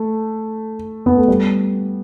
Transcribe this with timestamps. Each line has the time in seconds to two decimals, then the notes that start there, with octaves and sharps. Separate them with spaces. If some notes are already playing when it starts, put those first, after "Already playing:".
Already playing: A3
1.06 B3
1.17 A3
1.28 G3